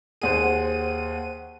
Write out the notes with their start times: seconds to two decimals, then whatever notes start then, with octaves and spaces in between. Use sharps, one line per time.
0.21 D#2 G#4 C5 F#5 D#7